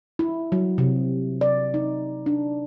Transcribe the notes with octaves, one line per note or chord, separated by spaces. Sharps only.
E4
F#3
C3
D5
D#4
D4